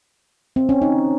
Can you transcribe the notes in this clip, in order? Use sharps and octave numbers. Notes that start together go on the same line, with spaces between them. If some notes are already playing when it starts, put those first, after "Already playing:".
C4
C#4
D#4